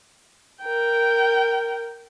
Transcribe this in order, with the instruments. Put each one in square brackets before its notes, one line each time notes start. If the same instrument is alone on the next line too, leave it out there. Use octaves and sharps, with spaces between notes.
[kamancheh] A#4 G5